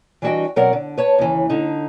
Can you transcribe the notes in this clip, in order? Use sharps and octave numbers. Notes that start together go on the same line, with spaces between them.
E3 G3 D4 F#4 D#5 G5
B2 F#3 C4 A#4 D5 F#5
D3
B4 C#5 A5
D#2 C#3 E3
D3 D#4